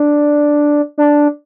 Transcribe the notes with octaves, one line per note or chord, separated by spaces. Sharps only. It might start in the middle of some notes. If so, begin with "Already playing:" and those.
Already playing: D4
D4